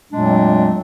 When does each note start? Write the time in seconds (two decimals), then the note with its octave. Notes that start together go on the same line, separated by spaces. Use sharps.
0.12 F2 A#2 F#3 G#3 A3 D4